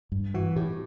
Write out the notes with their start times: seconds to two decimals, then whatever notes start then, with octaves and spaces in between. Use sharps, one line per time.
0.12 G2
0.34 E3 F#4
0.56 A2 G4